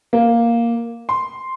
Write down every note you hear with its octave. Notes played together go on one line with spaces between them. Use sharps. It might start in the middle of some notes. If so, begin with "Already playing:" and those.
A#3
C6